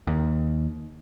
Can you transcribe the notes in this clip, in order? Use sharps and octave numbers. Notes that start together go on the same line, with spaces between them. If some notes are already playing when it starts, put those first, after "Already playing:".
D#2